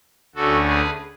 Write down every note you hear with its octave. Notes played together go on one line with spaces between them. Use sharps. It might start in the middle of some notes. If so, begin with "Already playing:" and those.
D2 D3 A3 C#4 F#4 A4
G#4 B4